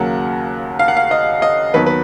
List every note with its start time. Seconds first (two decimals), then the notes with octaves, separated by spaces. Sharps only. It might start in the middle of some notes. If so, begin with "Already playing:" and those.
Already playing: D#2 C#3 F#3 A#3 F#5
0.79 F5
0.88 F#5
0.97 F5
1.11 D#5
1.42 D#5
1.74 D#2 D#3 F#3 B3 B4
1.86 B4